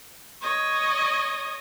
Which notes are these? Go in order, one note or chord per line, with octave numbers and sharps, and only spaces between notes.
C#5 D#5